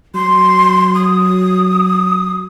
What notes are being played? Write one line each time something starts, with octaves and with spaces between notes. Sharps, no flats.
F#3 C6
D#6